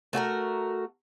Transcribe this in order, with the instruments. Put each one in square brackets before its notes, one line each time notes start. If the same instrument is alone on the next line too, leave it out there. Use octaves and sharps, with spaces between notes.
[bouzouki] A3 F#4 G#4 A#4